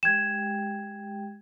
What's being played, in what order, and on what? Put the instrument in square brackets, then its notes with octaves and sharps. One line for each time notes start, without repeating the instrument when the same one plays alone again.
[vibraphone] G#3 G4 G5 [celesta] G#6 E7